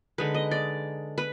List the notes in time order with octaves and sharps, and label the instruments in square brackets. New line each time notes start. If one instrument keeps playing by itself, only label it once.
[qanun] D3 G#3 D#4 B4
D#5
D5
B4